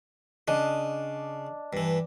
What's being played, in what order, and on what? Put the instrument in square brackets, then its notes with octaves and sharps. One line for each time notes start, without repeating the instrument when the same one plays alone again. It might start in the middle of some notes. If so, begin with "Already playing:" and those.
[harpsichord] C#3 [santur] D4 [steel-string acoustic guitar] D#5
[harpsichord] G2 E3